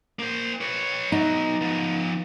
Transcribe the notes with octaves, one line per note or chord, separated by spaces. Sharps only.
A#3 C5
B4 C#5
F#3 B3 D#4
F3 B3